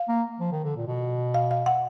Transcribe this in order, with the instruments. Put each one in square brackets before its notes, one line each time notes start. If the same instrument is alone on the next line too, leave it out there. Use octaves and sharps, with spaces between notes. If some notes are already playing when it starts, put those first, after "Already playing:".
Already playing: [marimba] F5
[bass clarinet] A#3
F3
D#3
D3
A#2
B2
[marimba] F5
F5
F#5